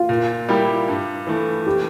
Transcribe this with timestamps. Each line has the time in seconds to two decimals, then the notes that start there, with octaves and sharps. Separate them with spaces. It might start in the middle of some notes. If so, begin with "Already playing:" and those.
Already playing: F4
0.09 A#2
0.49 G3 A#3 E4 G4
0.88 G2
1.27 E3 A3
1.66 G4